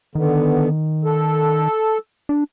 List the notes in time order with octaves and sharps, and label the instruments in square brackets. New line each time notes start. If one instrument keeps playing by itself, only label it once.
[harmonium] D3 B3 [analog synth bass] D#3
[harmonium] A4
[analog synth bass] D4